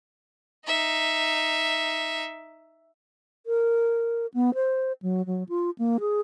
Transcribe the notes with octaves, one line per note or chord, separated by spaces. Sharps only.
D#4 E5
A#4
B3
C5
F#3
F#3
F4
A#3
G#4